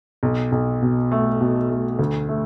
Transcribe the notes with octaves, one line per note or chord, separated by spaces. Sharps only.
B1
B1
B2
A3
B2
A3
D2
A3